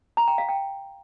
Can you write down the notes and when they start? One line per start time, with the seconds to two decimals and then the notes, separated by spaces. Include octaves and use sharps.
0.17 A#5
0.28 G5
0.38 F5
0.49 G5